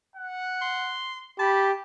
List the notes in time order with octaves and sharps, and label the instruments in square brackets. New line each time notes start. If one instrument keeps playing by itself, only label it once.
[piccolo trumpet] F#5
[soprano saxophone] C6
[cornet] G4 [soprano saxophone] A5 [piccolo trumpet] B5